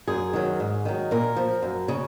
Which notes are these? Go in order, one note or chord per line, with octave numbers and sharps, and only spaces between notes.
F#2 G#4
D#3 F#3
G#2
D#3 F#3
A#2 A#4
F3
F#2
C#3